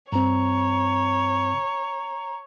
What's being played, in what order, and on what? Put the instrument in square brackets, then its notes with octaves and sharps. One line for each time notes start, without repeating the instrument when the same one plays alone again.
[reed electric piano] G2 C4 [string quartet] C#5 [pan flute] A#5